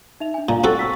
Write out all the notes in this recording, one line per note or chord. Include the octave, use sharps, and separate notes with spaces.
D#4 E5 F7
D4 G#5
A#2 F5 G#5 A#5
C4 F#4 A4 F#6 A6
C#6 E6 B6